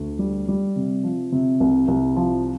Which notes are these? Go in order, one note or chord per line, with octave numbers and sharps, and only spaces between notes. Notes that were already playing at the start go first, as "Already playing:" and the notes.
Already playing: D2
G3
G3
C3
F3
C3
C2
C2
F3